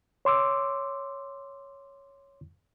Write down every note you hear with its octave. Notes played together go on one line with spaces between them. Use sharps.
C#5 C6 D6 E6